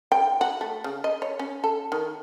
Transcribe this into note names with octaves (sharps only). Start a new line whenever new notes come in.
G5
F#4
A3
C#3
D#5
C#5
C#4
A4
D#3